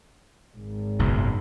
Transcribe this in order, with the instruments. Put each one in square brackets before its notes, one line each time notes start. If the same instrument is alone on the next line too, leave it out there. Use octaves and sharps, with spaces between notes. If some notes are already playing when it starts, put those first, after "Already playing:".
[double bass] G#1 G#2
[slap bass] F#1 B1 F#2